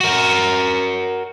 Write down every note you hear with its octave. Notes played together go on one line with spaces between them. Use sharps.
F#4 A#4